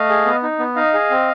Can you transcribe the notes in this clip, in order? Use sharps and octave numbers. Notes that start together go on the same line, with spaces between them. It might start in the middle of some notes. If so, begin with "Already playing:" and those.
Already playing: A3 D#5 F5
G#4
B3
D#4
B3
D#4 D#5 F5
G#4
C4